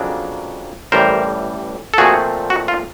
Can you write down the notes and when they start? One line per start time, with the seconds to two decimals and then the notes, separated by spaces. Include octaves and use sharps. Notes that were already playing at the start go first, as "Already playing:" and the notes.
Already playing: F2 C#3 F#3 A#3 D4
0.92 A1 A2 E3 G3 A#4 C5
1.94 A4
1.98 A#2 F3 A3 C4 F#4 G#4
2.50 F#4
2.68 F4